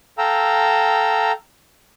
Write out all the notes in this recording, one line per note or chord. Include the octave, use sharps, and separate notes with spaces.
A4 F5 G5 A#5 E6